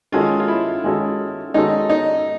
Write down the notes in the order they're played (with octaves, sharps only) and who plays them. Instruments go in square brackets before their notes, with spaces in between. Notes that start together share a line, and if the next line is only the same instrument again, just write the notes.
[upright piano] D#3 G#3 C#4 F#4 A4 [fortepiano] F4
[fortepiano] F4
E4
[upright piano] D#3 G#3 C#4 F#4 A4
[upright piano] D#3 G#3 C#4 F#4 A4 [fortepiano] D#4
[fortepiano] D#4